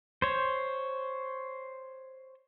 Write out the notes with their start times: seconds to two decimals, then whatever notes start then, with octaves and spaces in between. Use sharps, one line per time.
0.22 C5 C#5